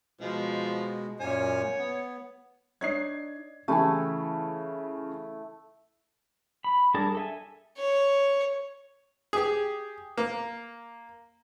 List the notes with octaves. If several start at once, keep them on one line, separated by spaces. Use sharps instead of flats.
B2 F3 G#3
F#2 A#2 C#5 G#5
B3
D4 D#4 C#5 G#6 C7
C#3 E3 A3 E4 G4 G#5
B5
G3 D4 G#4 A#4 A5
A4 E5 G#5
C#5
G4 G#4
A#3